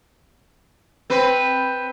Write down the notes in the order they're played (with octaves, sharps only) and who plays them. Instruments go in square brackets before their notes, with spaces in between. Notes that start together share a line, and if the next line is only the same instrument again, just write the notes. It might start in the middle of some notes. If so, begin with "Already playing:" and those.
[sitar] C4 B4